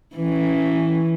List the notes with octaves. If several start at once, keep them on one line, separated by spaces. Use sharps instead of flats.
E3 C#4